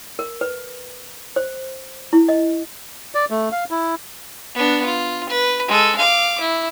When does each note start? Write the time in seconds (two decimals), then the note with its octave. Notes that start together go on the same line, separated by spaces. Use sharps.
0.19 A#4
0.41 B4
1.36 C5
2.13 E4
2.29 D#5
3.15 D5
3.30 A3
3.52 F5
3.71 E4
4.55 B3 D4
4.86 F4
5.30 B4
5.68 G#3 A4
5.98 F5 D6
6.41 E4